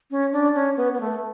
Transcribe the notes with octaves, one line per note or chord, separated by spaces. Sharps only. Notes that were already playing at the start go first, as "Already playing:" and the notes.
C#4
D4
C#4
B3
B3
A3